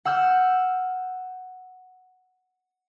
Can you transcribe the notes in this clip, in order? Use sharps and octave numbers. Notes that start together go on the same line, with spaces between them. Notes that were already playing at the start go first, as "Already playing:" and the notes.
F#5 E6 F6 G6